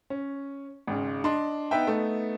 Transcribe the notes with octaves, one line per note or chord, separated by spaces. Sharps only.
C#4
G#1 G#2 C#3
D4 D#5 C6
B3 D#4 B4 E5 G5
A3 B3 D#4